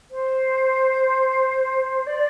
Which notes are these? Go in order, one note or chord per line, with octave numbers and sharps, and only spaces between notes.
C5
D5